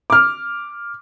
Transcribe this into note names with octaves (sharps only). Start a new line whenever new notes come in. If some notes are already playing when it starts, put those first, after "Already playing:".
D6 F6